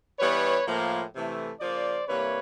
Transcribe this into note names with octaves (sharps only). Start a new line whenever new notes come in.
E3 G3 B3 B4 C#5
A2 F3 A#3
C3 E3 A3
C#3 F3 A#3 C5 D5
C3 E3 G3 A#3 B4 C#5